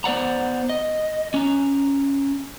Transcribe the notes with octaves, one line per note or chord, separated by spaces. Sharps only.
B3 C5 D5 F#5 A#5
D#5
C#4 A#5